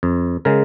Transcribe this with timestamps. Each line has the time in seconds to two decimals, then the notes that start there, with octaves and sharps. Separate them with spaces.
0.03 F2
0.45 C#3 G#3 A#4